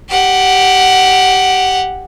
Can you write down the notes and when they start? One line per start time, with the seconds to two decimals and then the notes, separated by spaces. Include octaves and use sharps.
0.10 G4 F#5